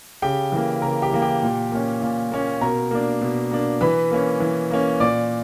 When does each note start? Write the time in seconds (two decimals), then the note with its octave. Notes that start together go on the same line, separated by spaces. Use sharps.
0.22 C#3 G4 G5
0.52 E3 A#3
0.82 C#3 A#4 A#5
1.02 G4 G5
1.12 E3 A#3
1.22 G4 G5
1.42 A#2
1.72 A#3 C#4
2.02 A#2
2.32 A#3 C#4
2.61 B2 A#4 A#5
2.91 A#3 D4
3.21 B2
3.51 A#3 D4
3.81 E3 B4 B5
4.11 A#3 C#4
4.40 E3
4.71 A#3 C#4
5.00 A#2 D5 D6